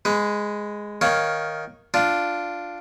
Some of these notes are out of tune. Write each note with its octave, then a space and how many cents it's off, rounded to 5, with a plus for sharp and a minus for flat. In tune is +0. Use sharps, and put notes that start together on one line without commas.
G#3 +0 B4 +20
D#3 +5 C#5 +0 F5 +0
D4 +0 F4 +0